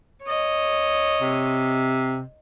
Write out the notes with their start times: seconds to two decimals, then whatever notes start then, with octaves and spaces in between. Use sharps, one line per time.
0.23 C#5 D#5
1.21 C3